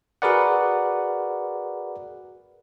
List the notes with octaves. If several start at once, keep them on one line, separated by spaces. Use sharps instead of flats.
F#4 G#4 A#4 B4 D5 F#5